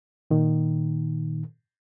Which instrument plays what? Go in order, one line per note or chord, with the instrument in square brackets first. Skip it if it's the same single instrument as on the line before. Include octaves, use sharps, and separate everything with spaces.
[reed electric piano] A#2 D#3